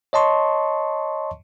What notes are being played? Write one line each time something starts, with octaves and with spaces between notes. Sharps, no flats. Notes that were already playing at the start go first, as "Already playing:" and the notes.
C#5 D#5 A5 C6 C#6